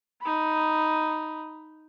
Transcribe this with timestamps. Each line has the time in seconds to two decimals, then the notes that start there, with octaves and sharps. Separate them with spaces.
0.22 D#4 B5